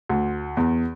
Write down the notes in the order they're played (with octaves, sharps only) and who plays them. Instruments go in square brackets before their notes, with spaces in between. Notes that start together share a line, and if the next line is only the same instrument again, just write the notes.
[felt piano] D2
E2